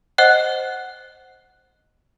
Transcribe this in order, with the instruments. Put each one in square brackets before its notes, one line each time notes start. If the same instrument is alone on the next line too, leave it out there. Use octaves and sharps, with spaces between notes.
[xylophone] C5 D#5 F#5 F#6